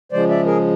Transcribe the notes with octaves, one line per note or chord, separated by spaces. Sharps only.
C#3 F3 G#3 C5 D5
D5 E5
G#4 A#4